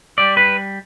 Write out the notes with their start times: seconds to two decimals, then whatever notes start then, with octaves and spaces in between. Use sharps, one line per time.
0.18 G3 D5
0.37 B4